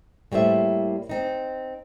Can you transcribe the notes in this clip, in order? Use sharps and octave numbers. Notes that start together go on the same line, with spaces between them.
A2 G3 A#3 C5 E5
C4 D#4